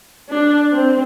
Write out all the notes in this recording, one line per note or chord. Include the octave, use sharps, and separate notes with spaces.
D4
C4